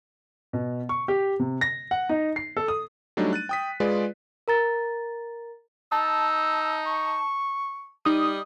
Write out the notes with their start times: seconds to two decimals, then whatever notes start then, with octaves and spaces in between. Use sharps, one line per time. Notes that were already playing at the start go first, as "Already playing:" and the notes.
0.53 B2
0.89 C#6
1.08 G4
1.40 C3
1.61 A#6
1.91 F#5
2.09 D#4
2.36 C7
2.57 A4
2.68 D#6
3.17 F#3 G3 A3 D4 D#4
3.33 F#6 A6 D#7
3.49 G5 D#6 B6
3.80 G#3 F4 G#4 B4 D5
4.48 A#4 A#5 A6
5.92 D#4 A5 E6
6.87 C#6
8.05 G3 D#4 D#6